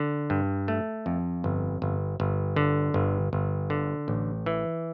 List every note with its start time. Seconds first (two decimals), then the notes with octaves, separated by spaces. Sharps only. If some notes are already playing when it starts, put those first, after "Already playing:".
Already playing: D3
0.30 G2
0.68 A3
1.06 F2
1.44 G1
1.82 G1
2.20 G1
2.56 D3
2.94 G1
3.33 G1
3.70 D3
4.08 A1
4.46 E3